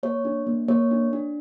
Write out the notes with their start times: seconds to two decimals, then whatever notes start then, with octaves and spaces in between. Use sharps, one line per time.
0.03 A#3 C#5
0.25 D4
0.47 A#3
0.68 A#3 C#5
0.91 D4
1.13 D4